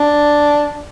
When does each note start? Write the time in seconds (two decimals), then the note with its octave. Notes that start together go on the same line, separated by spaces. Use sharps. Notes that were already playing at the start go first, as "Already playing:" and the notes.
Already playing: D4